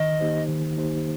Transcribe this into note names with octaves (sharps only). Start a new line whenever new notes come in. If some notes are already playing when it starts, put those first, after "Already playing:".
Already playing: D#3 D#5
A#3 D#4 G4 C5
D#3
A#3 D#4 G4 C5